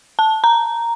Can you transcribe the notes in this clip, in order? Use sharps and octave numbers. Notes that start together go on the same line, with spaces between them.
A5
A#5